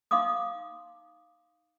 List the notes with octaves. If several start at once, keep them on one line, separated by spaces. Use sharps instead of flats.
D#4 F5 C6 D6 D#6